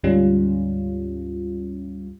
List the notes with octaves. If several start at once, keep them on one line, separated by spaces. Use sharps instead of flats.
D2 G#2 G3 C#4 F4